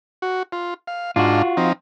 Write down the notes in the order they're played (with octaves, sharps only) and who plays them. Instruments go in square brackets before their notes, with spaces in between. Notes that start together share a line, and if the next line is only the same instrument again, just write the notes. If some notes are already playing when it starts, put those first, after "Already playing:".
[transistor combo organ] F#4
F4
F5
[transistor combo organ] G#2 D4 F5 [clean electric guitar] F4 F#4
[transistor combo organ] F3 C4 D#4